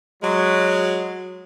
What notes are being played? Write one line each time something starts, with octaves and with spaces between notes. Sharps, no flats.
F#3 G#3